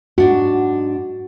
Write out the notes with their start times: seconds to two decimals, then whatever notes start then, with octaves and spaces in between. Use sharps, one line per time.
0.18 G#2 D4 F#4 F#5